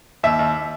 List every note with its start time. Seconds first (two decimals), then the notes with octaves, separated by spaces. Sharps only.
0.23 D#2 E5
0.39 D#2